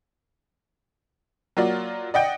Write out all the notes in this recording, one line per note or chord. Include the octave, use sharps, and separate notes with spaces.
F#3 A#3 F4 F#4 D5
D5 D#5 F#5 G5